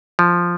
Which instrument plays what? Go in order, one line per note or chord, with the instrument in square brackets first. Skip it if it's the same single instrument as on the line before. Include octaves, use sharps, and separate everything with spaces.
[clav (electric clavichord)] F3